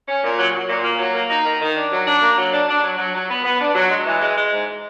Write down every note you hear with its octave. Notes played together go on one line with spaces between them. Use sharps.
C#4
A#2
F#3
F#3
A#2
A#3
F#3
A#3
D#4
D#3
D#3
D4
F#3
D4
A#3
F#3
D4
D4
F#3
F#3
F#3
B3
B3
D4
F#3
G#3
E3
G#3
G#3
G#2